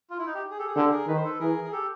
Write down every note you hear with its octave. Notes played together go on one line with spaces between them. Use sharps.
F4
E4
D#4
G4
G#4
G4 A4
G#4
D3 G4 A4
G#4 A#4
D#3 B4
C5
A4 B4
E3 G#4 A#4
G#4
G4 A4